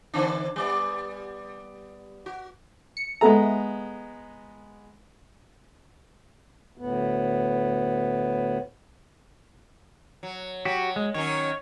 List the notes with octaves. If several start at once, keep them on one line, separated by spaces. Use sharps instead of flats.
D3 C4 D4
G3 B3 D5
F#4
C#7
G#3 B3 A4 E5 A#5
D2 A2 B3
F#3
F#3 F#4 G4
G#3
D#3 F#3 C#4 C#5